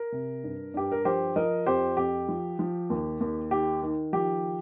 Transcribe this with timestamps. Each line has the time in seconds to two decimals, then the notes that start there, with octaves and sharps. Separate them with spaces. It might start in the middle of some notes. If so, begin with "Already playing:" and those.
Already playing: A#4
0.12 C3
0.44 G2
0.74 G2 G4
0.92 A#4
1.05 F3 G4 C5
1.36 F3 A#4 D#5
1.66 F2 G4 C5
1.97 F2 G4
2.28 F3
2.59 F3
2.90 D#2
3.20 D#2
3.51 D#3 G4
3.83 D#3
4.13 F3 G4